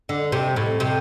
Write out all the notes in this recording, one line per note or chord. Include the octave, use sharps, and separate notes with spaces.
D3
C3
A2
C3